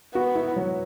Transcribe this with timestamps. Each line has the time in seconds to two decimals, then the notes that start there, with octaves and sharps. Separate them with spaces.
0.15 B3 F#4
0.36 E4
0.56 F#3